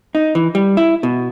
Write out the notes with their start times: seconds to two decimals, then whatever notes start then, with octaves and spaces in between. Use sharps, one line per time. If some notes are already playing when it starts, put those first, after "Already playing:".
0.15 D#4
0.35 E3
0.55 G3
0.77 E4
1.03 B2